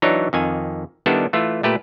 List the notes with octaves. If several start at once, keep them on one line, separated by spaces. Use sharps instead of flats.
E3 F#3 D4 D#4 C#5
F2 D#3 G#5
D#3 G3 B3 D4 E4 A4
E3 A3 F4
A#2 A3 G4 B4